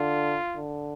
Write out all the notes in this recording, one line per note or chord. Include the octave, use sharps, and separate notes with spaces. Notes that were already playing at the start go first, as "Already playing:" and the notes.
Already playing: D3 F4
D3